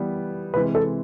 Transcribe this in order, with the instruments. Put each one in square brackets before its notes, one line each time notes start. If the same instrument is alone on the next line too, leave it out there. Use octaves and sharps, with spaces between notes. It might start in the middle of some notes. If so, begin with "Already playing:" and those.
Already playing: [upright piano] E3 G3 B3
[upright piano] C3 E3 G#3 C4 [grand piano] B4
[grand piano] A4